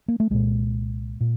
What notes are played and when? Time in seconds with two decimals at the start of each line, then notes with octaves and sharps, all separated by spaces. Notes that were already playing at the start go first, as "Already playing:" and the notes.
0.08 A#3
0.20 A3
0.30 C2 A#2 G#3
1.21 A#2